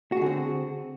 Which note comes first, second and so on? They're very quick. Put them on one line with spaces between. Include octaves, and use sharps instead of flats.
F#4 G#4 D3 C4